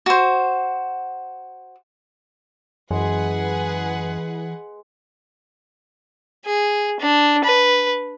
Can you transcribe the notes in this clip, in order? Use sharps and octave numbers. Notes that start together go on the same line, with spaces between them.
F#4 C5
F#2 E3 G#3 G#4 B4 F#5
G#4
D4
B4